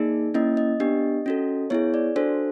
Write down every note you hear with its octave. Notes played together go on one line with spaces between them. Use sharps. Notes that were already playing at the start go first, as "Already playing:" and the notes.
Already playing: A#3 D#4 G#4 D5
A#3 C#4 E4 D#5
D#5
B3 D4 G4
C#4 F#4 A4
B3 E4 G#4 C#5
D5
D4 F#4 A4 C5